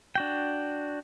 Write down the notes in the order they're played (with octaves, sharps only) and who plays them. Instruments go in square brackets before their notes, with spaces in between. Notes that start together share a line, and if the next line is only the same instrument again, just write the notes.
[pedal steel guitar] D4 F#4 G5